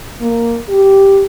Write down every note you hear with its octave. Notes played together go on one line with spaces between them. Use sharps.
A#3
G4